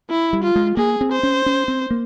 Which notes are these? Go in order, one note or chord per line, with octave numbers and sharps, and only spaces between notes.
E4
G3
F4
G#3
A#3 G#4
C4
C5
C#4
C#4
C4
A#3